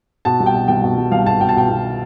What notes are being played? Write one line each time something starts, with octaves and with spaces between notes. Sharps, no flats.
B2 A5
C2
G5
B2
C2 G5
B2
C2
C2 F5
B2 A5
B2 G5
A5
B2 G5
B2